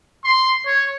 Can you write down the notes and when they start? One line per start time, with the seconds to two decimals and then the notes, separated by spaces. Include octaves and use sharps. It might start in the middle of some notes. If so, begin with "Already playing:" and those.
0.24 C6
0.66 C#5